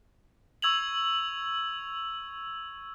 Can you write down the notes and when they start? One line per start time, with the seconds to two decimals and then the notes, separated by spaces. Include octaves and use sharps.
0.62 C#6 E6 G#6 F7 F#7